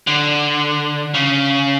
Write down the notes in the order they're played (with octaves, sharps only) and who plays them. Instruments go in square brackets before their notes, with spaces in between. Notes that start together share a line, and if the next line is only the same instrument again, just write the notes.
[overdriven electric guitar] D3
C#3